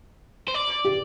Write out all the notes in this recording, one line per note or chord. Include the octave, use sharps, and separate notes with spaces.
C5
D5
G4